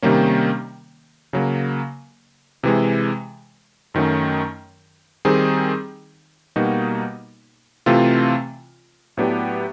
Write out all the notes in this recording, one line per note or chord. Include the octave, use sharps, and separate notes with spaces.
C3 D#3 G3 A#3 C#4
C#3 F#3 A#3
C3 E3 G#3
F#2 D#3 F#3 A3 C#4
D#3 G3 C4 D#4 G#4
B2 G3 A#3 D#4 F#4
C3 E3 A3 C4 F4
A2 F#3 B3 D4 G4